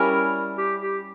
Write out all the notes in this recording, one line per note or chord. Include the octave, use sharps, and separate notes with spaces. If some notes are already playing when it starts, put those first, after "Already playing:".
Already playing: G3 C#4 E4 A#4
G4
G4